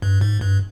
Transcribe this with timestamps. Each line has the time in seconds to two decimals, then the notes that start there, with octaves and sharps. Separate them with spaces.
0.02 G2
0.21 G#2
0.41 G2